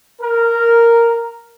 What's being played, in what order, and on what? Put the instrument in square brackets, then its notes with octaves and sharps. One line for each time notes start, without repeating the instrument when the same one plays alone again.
[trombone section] A#4